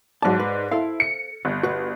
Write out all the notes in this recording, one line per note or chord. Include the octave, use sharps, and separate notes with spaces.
G#2 F#3 D5 A5
B4
E4 A4 C5 F5
C#7
G1
F#4 B4